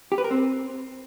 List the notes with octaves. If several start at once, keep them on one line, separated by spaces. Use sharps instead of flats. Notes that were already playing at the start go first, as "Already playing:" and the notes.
G4
B4
A#4
C4